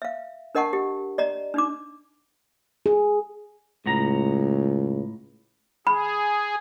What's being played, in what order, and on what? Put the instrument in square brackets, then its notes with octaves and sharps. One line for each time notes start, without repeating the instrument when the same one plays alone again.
[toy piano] E5 F5
D4 A#4 D#5 F#5 A5 C#6
G4
D5 D#5 A#5
D4 D#4 D6
[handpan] G#4
[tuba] C#2 [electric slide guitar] A2 F#5 A#5
[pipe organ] G#4 [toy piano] B5